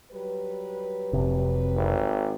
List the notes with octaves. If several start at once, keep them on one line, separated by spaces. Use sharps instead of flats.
F#3 G3 B4
F1 C3
G#1